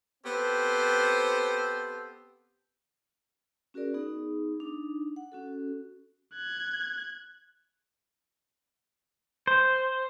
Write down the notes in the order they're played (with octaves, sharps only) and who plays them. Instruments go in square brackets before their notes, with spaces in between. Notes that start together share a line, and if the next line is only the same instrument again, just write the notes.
[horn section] B3 C4 G4 A4 C5
[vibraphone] C#4 F#4 G#4 A#4 D5
B3 D#4 G#4
D4 D#4
F#5
C#4 F#4 A4
[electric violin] F#6 G#6
[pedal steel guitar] C5